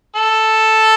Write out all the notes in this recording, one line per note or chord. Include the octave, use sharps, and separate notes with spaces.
A4